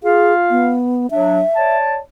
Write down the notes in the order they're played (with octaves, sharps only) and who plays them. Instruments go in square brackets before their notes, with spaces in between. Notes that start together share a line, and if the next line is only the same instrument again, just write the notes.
[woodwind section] F4 F5 [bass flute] G#4
[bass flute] B3
[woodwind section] F#3 D4 [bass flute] E5
[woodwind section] C#5 D5 A5